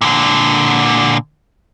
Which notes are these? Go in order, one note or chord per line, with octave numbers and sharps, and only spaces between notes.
A#2 D3